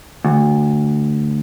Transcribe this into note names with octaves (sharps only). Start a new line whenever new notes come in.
D2